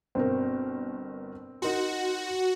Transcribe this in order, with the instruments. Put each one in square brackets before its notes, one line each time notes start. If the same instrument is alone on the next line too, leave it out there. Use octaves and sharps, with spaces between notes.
[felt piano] G1 B2 A#4 [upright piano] C4
[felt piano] D#4 A#4 C6 [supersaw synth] F#4